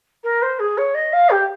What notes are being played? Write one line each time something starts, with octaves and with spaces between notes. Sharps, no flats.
A#4
C5
G#4
C#5
D#5
F5
G4